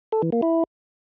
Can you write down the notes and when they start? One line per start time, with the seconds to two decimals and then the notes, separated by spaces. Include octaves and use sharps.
0.12 A4
0.22 E3
0.32 A#3
0.42 E4